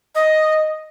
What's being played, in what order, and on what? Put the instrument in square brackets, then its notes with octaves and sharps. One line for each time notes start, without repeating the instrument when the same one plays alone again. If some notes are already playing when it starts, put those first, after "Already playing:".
[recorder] D#5